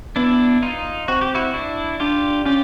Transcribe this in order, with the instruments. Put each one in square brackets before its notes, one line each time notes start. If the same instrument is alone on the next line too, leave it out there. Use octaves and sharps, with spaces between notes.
[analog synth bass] B3 [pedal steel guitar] D4 E4
[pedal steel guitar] D#4 F4
[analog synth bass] C4 [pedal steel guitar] F#4
[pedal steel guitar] G4
E4 F#4
D4 E4
[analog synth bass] D4 [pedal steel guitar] F4 G4
[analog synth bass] C#4 [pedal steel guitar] F4 G4